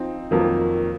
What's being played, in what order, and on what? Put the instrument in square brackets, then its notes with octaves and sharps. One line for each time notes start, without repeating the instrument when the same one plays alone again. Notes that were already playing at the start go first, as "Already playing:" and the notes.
Already playing: [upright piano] F3 C4 D#4
F2 D#3 F#3 A#3